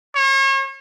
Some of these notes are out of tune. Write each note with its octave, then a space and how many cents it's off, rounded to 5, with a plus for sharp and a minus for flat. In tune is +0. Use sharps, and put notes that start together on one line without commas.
C#5 -40